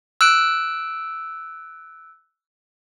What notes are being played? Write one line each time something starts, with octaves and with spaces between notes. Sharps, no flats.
E6 F#6 D7